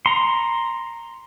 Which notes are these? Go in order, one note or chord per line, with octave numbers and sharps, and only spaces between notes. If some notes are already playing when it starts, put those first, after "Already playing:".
A#5 C6